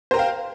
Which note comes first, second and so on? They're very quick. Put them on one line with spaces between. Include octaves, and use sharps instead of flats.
C5 A#4 G5 F5